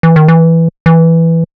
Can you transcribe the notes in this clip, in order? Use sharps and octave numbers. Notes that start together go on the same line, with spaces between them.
E3
D#3
E3
E3